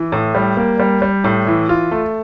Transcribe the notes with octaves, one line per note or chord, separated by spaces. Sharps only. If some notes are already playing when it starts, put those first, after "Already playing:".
Already playing: E3
A2
G3
A#3
G3
G3
A2
E3
F4
A3